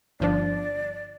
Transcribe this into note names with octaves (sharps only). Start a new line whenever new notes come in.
G1 F3 D4 D5